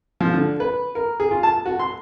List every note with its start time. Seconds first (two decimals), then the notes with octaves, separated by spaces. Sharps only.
0.21 F3
0.34 D3
0.60 B4
0.95 A#4
1.20 G#4
1.31 F4
1.43 A5
1.66 F#4
1.79 C6